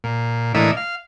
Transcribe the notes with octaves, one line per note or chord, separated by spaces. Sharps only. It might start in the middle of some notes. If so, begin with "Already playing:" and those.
A#2
A2 E3 A#3 D4 D#5 E5
F5